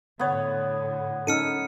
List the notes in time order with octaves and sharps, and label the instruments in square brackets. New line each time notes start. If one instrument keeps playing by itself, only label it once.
[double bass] A2 D3 [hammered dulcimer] B3 C#5
[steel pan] C#4 D#4 A4 [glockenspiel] F6 C#7 D#7